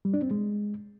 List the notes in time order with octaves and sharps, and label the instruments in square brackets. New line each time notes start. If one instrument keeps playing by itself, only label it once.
[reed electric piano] G3
D4
C4
G#3